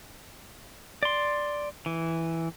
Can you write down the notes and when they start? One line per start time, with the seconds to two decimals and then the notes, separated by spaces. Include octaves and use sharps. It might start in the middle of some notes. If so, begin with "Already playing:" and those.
1.03 D5 C6
1.86 E3